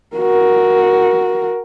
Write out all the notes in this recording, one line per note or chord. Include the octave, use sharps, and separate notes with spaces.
F#4 A#4